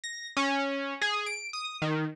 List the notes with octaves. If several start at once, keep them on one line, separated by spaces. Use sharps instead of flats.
A#6
C#4
G#4
D7
D#6
D#3